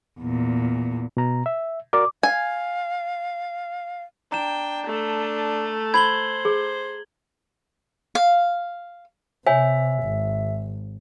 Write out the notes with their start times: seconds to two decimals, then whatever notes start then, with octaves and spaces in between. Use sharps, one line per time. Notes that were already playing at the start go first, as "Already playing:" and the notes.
0.20 E2 A#2
1.17 B2 A#5
1.46 E5
1.93 F#4 A#4 D5 D6
2.23 F5 G#5
4.32 D4 G5 A#5 E7
4.86 A3
5.94 C5 B5 G#6 F#7 G7
6.45 G#4
8.15 F5
9.47 C3 C#5 E5 G#5
10.03 G#1